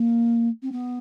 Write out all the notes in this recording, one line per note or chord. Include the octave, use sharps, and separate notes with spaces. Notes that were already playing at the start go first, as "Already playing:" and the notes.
Already playing: A#3
C4
B3